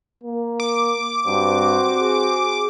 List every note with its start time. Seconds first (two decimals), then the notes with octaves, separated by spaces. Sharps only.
0.24 A#3
0.60 D6
1.26 G2 C4 F#4 C5
2.01 G#4